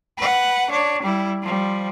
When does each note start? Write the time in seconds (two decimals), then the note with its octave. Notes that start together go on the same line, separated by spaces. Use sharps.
0.18 B4 F#5
0.70 D4 C#5
1.02 G3 E4
1.42 F3 G3